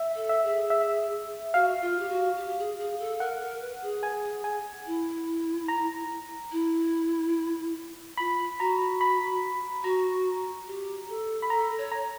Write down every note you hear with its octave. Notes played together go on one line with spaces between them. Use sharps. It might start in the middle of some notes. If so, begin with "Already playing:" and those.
Already playing: E5
A4
E5
G#4
E5
F#4 F5
F4
G4
F#4
G4
G4
G#4
G#4
A4
A#4 F#5
A#4
B4
G#4
G#5
G#5
E4
A#5
E4
F4 B5
F#4 A#5
B5
F#4 A#5
G4
A4
B5
A4 A#5
C#5
A#5